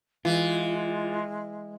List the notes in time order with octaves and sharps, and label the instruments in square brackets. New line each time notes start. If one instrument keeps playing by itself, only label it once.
[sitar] E3 [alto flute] G#3 [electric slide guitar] F4